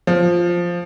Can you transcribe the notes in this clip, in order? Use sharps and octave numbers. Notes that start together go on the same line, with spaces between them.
F3